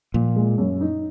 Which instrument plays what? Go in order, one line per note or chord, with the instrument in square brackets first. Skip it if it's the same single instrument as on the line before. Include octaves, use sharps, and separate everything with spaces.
[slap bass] A#2 [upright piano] F3
[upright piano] G#3
F#2
D#4